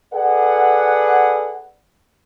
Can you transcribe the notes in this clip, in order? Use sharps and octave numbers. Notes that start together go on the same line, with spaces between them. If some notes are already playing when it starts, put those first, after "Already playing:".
G#4 A4 B4 D5 F#5